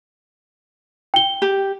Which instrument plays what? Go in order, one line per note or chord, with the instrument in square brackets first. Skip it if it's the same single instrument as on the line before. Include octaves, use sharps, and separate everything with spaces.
[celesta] G5 G7
[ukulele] G4